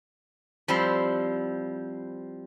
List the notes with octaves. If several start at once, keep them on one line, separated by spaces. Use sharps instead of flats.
F3 G3 C4 E4